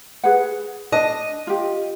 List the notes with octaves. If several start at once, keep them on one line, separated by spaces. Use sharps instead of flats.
G#4 B4 F#5
D4 D#5 A5
F4 G4